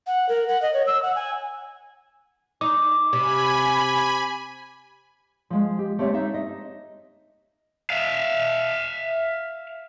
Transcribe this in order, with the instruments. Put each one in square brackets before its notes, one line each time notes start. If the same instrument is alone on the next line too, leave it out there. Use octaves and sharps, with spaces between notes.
[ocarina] F#5
A#4
F#5
D#5
C#5
E6
F#5
G#5
[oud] D#4 [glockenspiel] D6
[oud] C3 [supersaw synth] G#5 B5
[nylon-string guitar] F3 G#3
G4
A3 C4 G4 C#5 E5
D#4 E5
D#5
[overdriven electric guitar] E5 F5